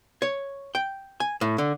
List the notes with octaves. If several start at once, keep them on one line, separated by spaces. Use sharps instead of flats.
C#5
G5
G#5
A2
D3